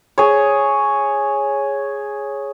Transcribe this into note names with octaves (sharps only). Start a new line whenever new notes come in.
G#4 C#5